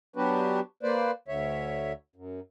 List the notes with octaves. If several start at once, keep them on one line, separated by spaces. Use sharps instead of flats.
F#3 B3 D4 F#4 G4 B4
A#3 B4 C5 D5
D2 D3 C#5 E5
F#2